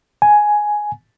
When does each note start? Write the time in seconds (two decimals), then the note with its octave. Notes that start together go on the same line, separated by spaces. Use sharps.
0.22 G#5